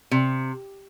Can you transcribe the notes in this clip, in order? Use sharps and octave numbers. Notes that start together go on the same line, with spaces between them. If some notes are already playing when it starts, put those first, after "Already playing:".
C3